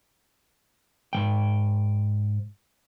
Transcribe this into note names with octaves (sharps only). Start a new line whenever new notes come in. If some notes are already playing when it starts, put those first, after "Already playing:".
G#2 F3 G5